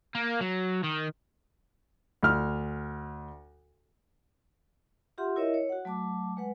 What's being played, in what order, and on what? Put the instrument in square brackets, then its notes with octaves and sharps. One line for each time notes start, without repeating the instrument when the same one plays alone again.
[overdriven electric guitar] A#3
F#3
D#3
[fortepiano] D2 F6
[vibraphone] F4 G4 E5 F#5 C6
E4 A#4 C#5 D#5 E5
C#5
F#4 F#5
F#3 A3 A5 D6
G#3 B4 F#5